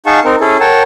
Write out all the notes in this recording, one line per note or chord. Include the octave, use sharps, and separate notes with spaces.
D#4 G#4 F5 F#5 A5 C#6
C4 D#4 A#4
C#4 E4 G#4 A4
A#4 C#5 F#5 G5 A5